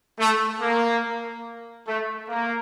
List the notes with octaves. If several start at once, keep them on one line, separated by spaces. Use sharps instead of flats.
A3
A#3
A3
A#3